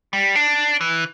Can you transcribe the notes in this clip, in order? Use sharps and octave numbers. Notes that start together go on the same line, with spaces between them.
G3
D4
E3